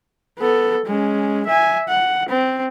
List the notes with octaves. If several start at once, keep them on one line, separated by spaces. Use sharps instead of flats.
B3 A4
G#3 C#4
E5 G#5
F#5
C4